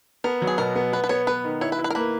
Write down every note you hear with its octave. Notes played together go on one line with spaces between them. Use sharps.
B3 A#4
F#3
G#4
B2 A#4
B3
B3 B4
B4
B3 C#5
B3 B4
D#3
E4 C#5
B4
E4
B4
A#4
A#3 B4